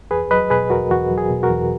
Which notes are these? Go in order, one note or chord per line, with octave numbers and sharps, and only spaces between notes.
E2 G#4 B4
F#3 B4 D#5
B2 G#4 B4
E2 F#4 A#4
E2 F#4
F#3
G#4
B2
F#4 A#4
E2